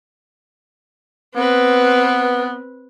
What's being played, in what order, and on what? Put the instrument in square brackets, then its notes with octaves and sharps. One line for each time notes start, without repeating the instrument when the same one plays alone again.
[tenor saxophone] B3 [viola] C4 B4